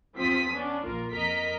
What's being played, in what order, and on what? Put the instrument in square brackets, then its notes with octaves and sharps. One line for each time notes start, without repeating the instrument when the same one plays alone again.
[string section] E2 F3 C4 F4 D#6 B6
B3 C#4 D4
A#1 A#3 F4 A#4
F2 A#4 D#5 A#5 B6